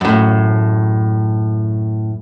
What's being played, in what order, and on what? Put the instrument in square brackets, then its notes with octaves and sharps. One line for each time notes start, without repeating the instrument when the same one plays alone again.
[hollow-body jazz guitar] F#2 A2